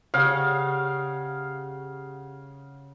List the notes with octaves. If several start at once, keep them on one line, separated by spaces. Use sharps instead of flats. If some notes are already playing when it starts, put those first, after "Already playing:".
C#3 G4 F5 F#5